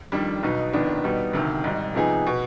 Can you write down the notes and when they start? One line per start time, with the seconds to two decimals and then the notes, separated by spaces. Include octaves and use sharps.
0.12 F2 D#3 G3 D4
0.43 B1 B2 B3 D#4
0.73 F1 F2 D#3 B3 D4
1.04 B2 G3 B3 D#4
1.33 D2 C3 D#3
1.63 G#1 G#2 G3
1.95 C3 F3 B3 D#4 G#4
2.27 B2 B3